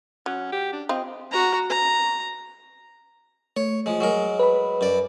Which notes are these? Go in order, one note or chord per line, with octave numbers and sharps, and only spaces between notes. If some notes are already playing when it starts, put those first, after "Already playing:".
F#3 C#4
G4
D4
C4 F4 D#5
F#4 A#5
A#5
A3 C#5
F3 G#3
F#3 G#3 A#4
B4 B5
F#2 D5